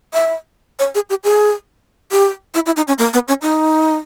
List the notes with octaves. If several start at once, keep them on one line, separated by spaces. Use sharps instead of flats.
E5
C#5
G#4
G4
G#4
G4
E4
E4
D#4
C#4
A#3
B3
C#4
D#4